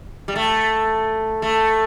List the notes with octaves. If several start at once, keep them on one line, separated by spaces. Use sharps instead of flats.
G3
A3
A3